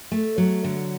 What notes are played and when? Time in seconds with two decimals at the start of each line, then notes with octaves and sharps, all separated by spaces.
0.12 A3
0.38 F#3
0.64 D3